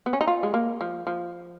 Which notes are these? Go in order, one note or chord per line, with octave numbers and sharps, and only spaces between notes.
B3
C#4
D#4
F4
G#3
A#3
F3
F3